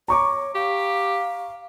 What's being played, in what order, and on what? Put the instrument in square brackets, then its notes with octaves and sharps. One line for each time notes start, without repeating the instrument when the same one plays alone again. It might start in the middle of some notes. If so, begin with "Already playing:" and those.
[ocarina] C#5 [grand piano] A#5 C#6 D6
[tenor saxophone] G4 [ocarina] F5